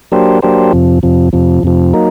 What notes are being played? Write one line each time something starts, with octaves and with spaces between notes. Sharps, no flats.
F#3 A#3 D4 G4 C5
F#3 A#3 D4 G4 C5
F2 C3 F3
F2 C3 F3
F2 C3 F3
F2 C3 F3
F#3 A#3 D#4